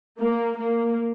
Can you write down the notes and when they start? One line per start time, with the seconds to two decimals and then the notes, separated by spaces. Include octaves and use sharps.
0.19 A#3
0.56 A#3